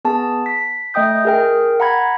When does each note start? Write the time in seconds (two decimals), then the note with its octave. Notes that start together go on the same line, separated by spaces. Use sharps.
0.05 B3 G#4 A5
0.46 B6
0.94 A3 D#5 G5 D#6 G6
1.25 G#4 A#4 G5
1.80 F#5 A#5 B5 G#6